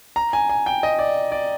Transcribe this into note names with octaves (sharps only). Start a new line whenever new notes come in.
A#5
G#5
G#5
G5
D#5
D5
D5